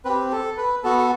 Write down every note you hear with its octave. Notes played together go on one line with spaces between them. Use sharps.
C4 G4 B4
A4
B4
B3 F#4 A4
A4